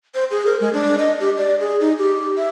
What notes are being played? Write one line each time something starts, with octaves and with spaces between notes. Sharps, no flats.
C5
G#4
A#4
G#3
D4
D#5
G4
D5
G#4
D#4
G4
E5